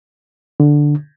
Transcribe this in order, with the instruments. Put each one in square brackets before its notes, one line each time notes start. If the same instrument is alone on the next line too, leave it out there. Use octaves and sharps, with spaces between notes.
[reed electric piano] D3